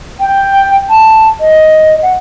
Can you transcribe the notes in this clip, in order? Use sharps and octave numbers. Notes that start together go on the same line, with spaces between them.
G5
A5
D#5
F#5